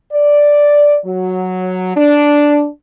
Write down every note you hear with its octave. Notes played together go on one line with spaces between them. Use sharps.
D5
F#3
D4